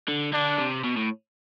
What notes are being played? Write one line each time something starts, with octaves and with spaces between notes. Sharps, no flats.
D3
D3 D4
C3
B2
A2